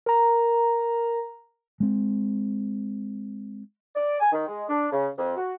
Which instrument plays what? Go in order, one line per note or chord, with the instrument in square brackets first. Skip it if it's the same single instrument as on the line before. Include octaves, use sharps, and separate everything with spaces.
[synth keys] A#4 A#5
[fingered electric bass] G#3 C4
[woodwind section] D5
G#5
D#3
G#3
D4
C#3
F2
F#4